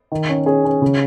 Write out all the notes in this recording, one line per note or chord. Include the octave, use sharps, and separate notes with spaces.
D#3
C#4
C#4 G#4
C#4
C#3